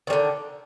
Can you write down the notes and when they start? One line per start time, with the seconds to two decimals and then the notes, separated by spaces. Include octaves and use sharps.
0.07 D#3
0.10 G3
0.13 D3